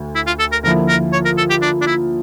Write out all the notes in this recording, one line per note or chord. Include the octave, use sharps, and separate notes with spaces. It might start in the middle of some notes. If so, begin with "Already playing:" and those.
Already playing: D2
E4
F4
A4
A#4
D3 F3 A#3 E4 A#4
A#4
C#5
A#4
A4
G4
D4
D4
E4